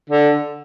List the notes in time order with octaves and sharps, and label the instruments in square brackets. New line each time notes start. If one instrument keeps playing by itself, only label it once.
[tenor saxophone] D3